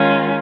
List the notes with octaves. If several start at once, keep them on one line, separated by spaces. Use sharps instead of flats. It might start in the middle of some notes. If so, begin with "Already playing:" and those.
Already playing: D#3 G#3 C#4 F4